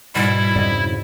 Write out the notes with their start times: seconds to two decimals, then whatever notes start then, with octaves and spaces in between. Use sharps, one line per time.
0.15 G#2 B2 G3 E4 B4
0.55 F2 C#3 D5 D#5